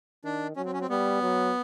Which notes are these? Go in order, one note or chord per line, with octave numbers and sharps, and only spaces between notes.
D#3 D4
F#3 C#4
C4
C#4
C4
G3 B3
F#3